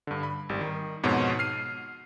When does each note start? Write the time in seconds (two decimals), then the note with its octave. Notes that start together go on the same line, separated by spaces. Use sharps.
0.07 G2 D3
0.23 B5
0.49 G#1 G3
0.61 D#3
1.03 F2 G#2 B2 F#4 C#5
1.39 F6 C7 D#7